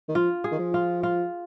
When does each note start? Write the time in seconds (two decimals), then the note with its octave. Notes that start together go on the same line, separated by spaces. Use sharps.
0.09 D#3
0.15 F3 F4
0.44 G#4
0.51 D#3
0.59 F3
0.74 F4
1.03 F4